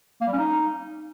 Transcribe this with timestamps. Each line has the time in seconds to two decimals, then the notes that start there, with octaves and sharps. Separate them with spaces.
0.21 A#3
0.27 G3
0.33 C#4
0.39 D#4